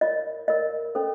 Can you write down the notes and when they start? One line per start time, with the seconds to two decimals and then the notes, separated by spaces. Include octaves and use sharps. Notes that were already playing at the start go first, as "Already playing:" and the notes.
0.01 F4 A#4 C#5 D#5
0.48 F4 A#4 C#5 D#5
0.95 C#4 A4 C5